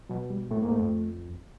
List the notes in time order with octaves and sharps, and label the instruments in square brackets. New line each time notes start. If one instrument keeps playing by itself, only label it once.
[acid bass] B2 [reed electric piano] F#3
[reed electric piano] G3
[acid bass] A2 [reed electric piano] A3
[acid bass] G#2 [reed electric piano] A#3
[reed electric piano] A3
[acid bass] F2